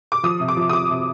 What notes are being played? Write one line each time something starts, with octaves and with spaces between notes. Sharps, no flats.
D6
F3 D#6
C3
D6
F3
D#6
F3 D6
C3